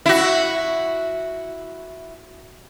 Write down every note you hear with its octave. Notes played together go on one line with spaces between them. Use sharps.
E4 F#4